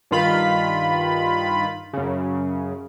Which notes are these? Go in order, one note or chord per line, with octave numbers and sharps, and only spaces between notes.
G2 D#3 F4 B5
F#2 C#3